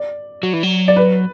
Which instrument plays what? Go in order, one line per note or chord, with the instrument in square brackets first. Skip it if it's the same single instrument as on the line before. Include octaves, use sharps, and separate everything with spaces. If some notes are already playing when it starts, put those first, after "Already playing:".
Already playing: [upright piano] D5
[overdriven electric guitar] F#3
E3
F#3
[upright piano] D5
B4